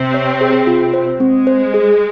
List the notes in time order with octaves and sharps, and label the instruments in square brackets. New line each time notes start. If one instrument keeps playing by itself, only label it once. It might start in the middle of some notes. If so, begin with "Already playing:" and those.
Already playing: [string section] C3 C4
[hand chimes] C#5
G#4
F4
C5
[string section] G#3 [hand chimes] C4
[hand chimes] C5
G#4